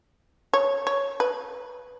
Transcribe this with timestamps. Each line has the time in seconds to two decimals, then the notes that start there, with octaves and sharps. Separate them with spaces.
0.53 C#5
0.87 C#5
1.20 B4